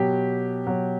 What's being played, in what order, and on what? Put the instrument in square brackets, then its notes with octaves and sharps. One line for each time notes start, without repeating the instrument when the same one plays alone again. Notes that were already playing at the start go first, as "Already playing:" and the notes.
Already playing: [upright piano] B2 F#3 G4
B2 F#3